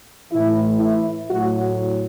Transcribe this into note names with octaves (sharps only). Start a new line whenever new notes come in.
A2 E3 E4
E4
A2 F#3 F#4